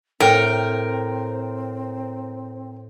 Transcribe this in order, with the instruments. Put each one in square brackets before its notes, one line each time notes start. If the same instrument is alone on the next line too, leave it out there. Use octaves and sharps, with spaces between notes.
[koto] A2 [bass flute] C4 [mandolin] A#4 [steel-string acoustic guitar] G5